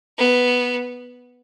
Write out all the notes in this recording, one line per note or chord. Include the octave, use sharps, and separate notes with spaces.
B3